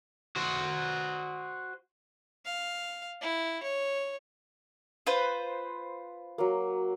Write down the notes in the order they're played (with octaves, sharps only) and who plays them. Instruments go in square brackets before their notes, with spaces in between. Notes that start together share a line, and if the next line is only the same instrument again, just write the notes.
[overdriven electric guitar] F#4 C5
[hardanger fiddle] F5
E4
C#5
[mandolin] F4 B4 C5
[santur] F#3 A#3